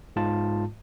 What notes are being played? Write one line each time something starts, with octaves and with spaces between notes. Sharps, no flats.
G#2 G#3 F4 A5